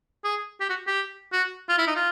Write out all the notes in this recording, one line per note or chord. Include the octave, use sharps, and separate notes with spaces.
G#4
G4
F#4
G4
F#4
F4
E4
D#4
F4